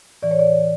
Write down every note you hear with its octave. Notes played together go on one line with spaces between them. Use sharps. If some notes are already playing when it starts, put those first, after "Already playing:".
A2 E3 D5
C#5
D5